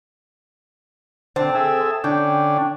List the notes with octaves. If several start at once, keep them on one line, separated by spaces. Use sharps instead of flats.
D3 C4 A5
G#4 A4 E5
D3 C#4 D4 G5